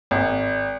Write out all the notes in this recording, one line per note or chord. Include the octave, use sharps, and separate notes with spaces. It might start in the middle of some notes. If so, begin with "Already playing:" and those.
G#1